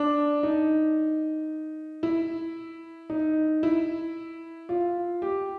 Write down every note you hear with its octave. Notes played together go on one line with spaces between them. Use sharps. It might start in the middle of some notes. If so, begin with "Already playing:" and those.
Already playing: D4
D#4
E4
D#4
E4
F4
G4